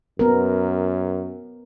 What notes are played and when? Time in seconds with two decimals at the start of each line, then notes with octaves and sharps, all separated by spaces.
0.19 F#2 B3 A#4